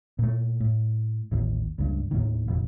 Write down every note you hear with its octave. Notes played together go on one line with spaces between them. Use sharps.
A#2 A3
A2
A1 D#2
C#2 G2
D#2 A2 D#3
F1 A#1